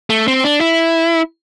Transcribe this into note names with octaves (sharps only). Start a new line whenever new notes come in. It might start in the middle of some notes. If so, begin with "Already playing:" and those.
A3
C4
D4
E4